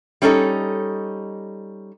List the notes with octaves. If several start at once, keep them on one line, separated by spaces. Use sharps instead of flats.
G3 C#4 D#4 A4 D#5